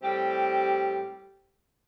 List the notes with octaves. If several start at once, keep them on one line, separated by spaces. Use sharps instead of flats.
A2 G3 C4 G4